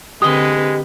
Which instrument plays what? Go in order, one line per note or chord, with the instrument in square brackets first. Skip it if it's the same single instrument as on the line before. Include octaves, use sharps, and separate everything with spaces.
[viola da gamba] D3 C4 B4 [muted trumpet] G#3 [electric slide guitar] G4 D#5 [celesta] D#6